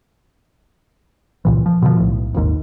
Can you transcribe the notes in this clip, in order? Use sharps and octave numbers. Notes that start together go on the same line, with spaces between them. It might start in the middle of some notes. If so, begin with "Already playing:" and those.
C#2 A#2 E3
F3
B2 D3 E3 F3
B1 A2
D#1 G#1 D#2 G#2